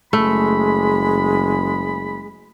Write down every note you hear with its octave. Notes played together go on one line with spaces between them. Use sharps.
F#1 G#3 A3 B5